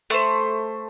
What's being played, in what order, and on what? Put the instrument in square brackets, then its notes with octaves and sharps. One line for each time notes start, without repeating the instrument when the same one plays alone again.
[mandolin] A3 C5